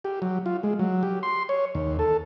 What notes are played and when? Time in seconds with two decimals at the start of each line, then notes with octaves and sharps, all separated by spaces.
0.05 G4
0.22 F#3
0.46 F4
0.63 G#3
0.79 F#3
1.03 G4
1.23 C6
1.49 C#5
1.75 D#2
1.99 A4